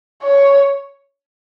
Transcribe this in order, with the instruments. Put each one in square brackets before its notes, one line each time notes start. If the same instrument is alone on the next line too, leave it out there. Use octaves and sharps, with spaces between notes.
[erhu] C#5